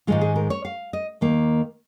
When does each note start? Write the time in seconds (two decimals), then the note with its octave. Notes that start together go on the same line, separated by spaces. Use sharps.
0.07 G#2 D#3 G#3 F4
0.21 G#4
0.36 A#4
0.50 C#5
0.65 F5
0.93 D#5
1.21 D#2 D#3 A#3